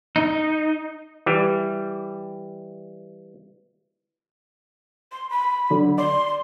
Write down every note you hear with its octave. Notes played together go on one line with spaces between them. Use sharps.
D#4
E3 G3
C6
B5
D3 F#3
D5 C6